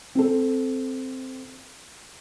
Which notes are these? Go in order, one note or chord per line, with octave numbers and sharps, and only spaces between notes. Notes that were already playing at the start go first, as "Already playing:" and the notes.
C4 A4